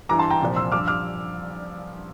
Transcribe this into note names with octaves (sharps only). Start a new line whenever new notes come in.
G2 E3 A#5 D6
A5 C6
G5 A#5
C2 A#2 F3
C6 E6
G2 F3 D6 F6
D6 F6